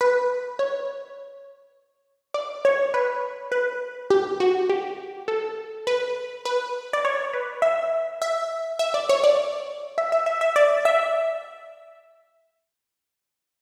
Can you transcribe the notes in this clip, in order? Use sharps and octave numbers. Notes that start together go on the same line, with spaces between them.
B4
C#5
D5
C#5
B4
B4
G4
F#4
G4
A4
B4
B4
D5
C#5
B4
E5
E5
E5
D5
C#5
D5
E5
E5
E5
E5
D5
E5